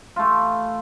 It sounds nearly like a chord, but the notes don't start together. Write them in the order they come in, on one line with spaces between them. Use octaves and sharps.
F4 A3 E3